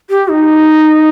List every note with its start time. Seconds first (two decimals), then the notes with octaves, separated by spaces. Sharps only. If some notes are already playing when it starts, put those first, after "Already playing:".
0.10 G4
0.29 D#4